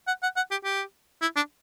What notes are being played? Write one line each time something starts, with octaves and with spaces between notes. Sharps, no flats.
F#5
F#5
F#5
G4
G4
E4
D4